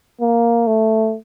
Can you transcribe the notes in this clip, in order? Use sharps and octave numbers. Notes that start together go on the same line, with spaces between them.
A#3
A3